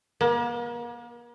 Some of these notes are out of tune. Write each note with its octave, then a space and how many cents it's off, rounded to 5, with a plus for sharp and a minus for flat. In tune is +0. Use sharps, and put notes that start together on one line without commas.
A#3 +40